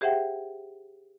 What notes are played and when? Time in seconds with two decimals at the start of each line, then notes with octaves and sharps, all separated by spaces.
0.01 G4 G#4 C5 E5 F#5 G5